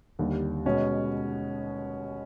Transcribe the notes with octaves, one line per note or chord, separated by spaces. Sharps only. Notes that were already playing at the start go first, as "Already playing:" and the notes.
D#2 D3 G3
B2 G#3 C#4